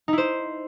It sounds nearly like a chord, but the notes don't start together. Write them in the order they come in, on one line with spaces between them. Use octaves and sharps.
D#4 E4 C5